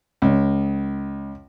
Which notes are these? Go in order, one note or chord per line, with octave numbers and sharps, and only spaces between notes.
C#2